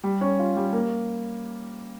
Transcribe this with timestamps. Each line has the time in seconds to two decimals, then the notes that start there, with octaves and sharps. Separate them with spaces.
0.04 G3
0.21 C#4
0.39 F4
0.56 G3
0.73 A#3